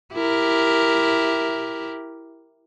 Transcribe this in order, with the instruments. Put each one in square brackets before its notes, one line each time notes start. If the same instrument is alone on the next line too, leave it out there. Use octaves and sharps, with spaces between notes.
[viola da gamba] E4 G4 A#4